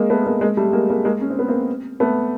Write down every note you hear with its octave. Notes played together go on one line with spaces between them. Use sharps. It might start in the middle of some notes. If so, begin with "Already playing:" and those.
Already playing: G#3 A#3
A3 B3
G#3 A#3
G#3 A#3
G3 A3
G#3 A#3
G#3 A#3
G#3 A#3
C#4
C4
B3
A#3 C4
A3 B3